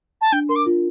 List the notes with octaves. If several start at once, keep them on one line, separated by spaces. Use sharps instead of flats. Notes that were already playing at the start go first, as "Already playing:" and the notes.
A5
D4 G5
A#4 C6
D6
F4